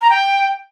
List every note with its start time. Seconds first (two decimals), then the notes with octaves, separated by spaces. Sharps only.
0.02 A#5
0.10 G5